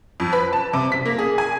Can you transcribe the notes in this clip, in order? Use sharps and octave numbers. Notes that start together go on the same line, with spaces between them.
F2
B4
A5
C3
B6
A#3
G#4
G#5